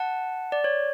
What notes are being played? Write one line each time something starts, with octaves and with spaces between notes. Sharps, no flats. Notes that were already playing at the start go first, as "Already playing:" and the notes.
Already playing: F#5 A5
D5
C#5